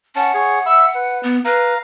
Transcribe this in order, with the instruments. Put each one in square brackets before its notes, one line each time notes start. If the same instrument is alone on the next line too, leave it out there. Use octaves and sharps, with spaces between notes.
[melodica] C#4 A5 [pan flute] F#5
[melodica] G#4 C#5
E5 B5 E6
B4
[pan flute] B3
[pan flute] B4 [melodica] F5 A#5